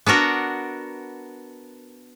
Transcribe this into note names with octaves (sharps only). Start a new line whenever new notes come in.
B3 D4 F#4 A#4